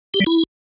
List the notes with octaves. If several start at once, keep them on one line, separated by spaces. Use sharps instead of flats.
G4
G3
E4